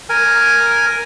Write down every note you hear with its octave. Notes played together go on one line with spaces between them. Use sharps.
A#4 G#5